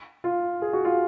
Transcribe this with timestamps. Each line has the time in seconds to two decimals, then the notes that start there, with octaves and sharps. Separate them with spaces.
0.24 F4
0.62 G#4
0.73 F#4
0.85 F4